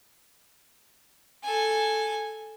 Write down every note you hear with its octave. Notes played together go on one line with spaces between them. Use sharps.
A4 G#5